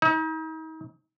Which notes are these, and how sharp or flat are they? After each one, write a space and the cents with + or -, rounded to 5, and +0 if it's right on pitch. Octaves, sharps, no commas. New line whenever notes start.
D#4 +40